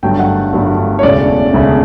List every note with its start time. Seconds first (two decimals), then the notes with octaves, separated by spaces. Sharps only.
0.03 G1 G2 D3 F#3 A3 G5
0.19 F#5
0.53 G1 G2 D3 F#3 A3
0.99 C#5
1.03 E1 D2 C#3 D5
1.54 E1 D2 C#3